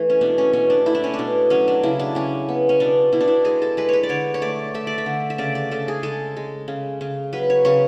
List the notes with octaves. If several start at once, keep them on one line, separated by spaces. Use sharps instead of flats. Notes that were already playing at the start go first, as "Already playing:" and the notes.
Already playing: E3 A3
C#4
B2 D4
C#4
B2 C#4
D4
A3 E4
D4
C#4
D4
B2
F#3 C#4
D4
C#3 E4
D4
C#3 C#4
B3
C#4
B2 D4
B2 E4
D4
E4
G#3 G#4
A4
G#3 B4
B4 C#5
D5
D3 C#5
C#5
A3 D5
A3 E5
D5
E5
D3
E5
C#3 D5
D5
C#3 A4
G#4
G#3 A4
G#3
C#3
C#3
F#3 B4
C#5
C#3 C#5